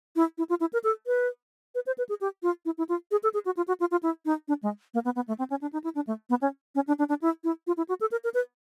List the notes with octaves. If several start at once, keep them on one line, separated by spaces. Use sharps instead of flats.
E4
E4
F4
E4
A#4
A4
B4
B4
C5
B4
G#4
G4
F4
E4
E4
F4
G#4
A4
G#4
F#4
F4
F#4
F4
F4
E4
D#4
D4
G#3
A#3
B3
B3
A3
C4
C#4
D4
D#4
E4
D4
A3
B3
C#4
C#4
D4
D4
D4
E4
E4
F4
E4
F#4
A4
A#4
A#4
B4